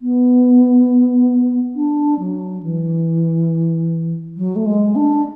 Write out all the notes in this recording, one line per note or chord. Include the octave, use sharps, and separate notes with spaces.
B3
D4
F#3
E3
F#3
A3
G#3
D4